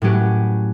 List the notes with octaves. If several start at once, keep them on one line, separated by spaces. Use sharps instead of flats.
A2 F#3 C#4 G4 B4